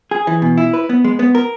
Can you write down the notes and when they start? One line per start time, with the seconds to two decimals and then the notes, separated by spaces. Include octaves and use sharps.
0.11 G#4
0.27 E3
0.42 B2
0.57 E4
0.74 B4
0.89 B3
1.04 G#3
1.19 B3
1.35 A#4